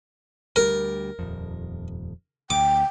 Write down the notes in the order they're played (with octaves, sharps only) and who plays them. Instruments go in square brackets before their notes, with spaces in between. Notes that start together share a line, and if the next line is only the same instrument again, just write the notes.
[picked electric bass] D2 F#3 G3 [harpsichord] A#4
[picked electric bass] D#1 F2
[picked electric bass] D2 [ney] G5 [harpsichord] D6